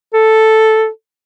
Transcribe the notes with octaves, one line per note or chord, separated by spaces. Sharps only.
A4